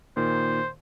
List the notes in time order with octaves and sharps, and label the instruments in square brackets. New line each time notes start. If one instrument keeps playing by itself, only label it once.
[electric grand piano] A#2 D#3 [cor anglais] C5